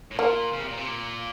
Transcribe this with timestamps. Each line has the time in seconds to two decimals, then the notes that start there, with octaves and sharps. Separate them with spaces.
0.11 A2
0.19 A#2 A#3
0.53 C#3
0.60 C3
0.69 A#2
0.77 C3
0.86 A#2